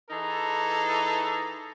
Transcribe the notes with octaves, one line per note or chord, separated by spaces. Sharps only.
E3 D#4 G#4 A4